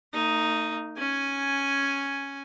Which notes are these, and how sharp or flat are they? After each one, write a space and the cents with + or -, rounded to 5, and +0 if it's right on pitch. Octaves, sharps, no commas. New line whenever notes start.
A3 +45 D#4 +0
C#4 +0 G#5 +0